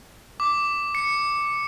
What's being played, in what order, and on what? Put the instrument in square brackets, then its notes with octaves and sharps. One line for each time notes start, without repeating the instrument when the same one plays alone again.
[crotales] D6
C#7